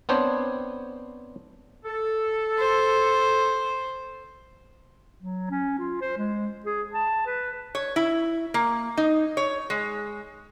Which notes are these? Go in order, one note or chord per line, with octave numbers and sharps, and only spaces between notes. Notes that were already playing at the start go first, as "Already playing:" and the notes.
B3 C4 D4 C5 C#5
A4
C5
F#3
C#4
F4
C5
G#3
G#4
A5
B4
C#5
E4
A#3
D#4
C#5
G#3